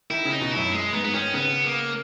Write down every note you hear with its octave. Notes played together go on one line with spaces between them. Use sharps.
D#3 E4
C#3
D#4
B2
F#2 E4
G#3
G#2 B3
B3
D#3 C#4
C#3 B3
A#3